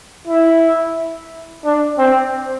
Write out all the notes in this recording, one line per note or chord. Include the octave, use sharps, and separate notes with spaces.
E4
D4
C4